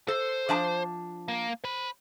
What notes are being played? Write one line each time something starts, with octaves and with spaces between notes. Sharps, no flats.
A4 C5
F3 D4 A5
A#3
C5 B5